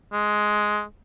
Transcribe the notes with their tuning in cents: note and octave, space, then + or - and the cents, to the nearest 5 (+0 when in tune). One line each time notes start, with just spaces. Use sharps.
G#3 +10